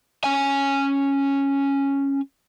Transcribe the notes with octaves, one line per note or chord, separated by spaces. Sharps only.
C#4 G#5